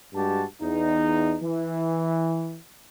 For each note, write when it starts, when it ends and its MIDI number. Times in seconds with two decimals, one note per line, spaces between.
0.14 0.43 43
0.14 0.43 56
0.14 0.43 66
0.14 0.43 67
0.14 0.43 81
0.61 1.35 40
0.61 1.35 63
1.42 2.57 52